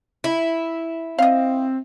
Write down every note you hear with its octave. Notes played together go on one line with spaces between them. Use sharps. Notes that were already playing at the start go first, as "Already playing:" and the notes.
E4
C4 D#5 F5